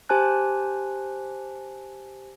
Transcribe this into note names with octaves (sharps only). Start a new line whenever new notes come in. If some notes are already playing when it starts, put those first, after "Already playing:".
G4 C5 G#5 A5 F#6